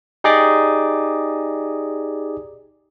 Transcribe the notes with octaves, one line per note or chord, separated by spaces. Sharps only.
D#4 G4 G#4 D5 D#5 D6